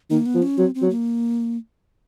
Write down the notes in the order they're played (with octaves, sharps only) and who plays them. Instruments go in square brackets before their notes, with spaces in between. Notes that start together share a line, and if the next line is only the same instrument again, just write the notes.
[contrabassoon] D#3 [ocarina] A#3
[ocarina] B3
[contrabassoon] F3
[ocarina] C#4
[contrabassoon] F#3 [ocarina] C4
[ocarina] C4
[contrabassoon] F#3
[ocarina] A#3